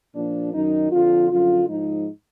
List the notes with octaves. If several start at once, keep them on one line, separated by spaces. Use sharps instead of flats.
A#2 F3 D4
F#2 D#3 D#4
F2 D3 F3 F4
F#2 D3 F3 F4
G#2 F3 D#4